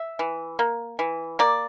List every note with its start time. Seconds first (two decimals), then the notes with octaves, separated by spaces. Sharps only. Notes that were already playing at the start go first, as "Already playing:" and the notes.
Already playing: E5
0.19 E3
0.59 A#3
0.99 E3
1.39 A#3 D5